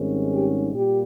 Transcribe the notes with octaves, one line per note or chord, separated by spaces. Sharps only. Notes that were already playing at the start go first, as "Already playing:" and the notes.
Already playing: G#1 G#2 G3 C#4
G4
A#2 G3 A#3 G4